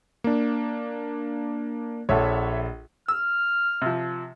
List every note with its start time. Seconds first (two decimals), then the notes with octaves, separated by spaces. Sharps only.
0.24 A#3 D4
2.09 A#1 A4 C#5 E5 F#5
3.08 E6 F6
3.82 C3 F3